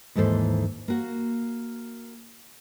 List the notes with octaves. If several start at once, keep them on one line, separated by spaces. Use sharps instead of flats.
D#2 G#2 E3 A4 C5
A#3 F#4